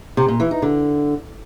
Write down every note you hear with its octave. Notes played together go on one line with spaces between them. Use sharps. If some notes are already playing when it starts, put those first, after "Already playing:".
C3
A#2
E3
D#4
D3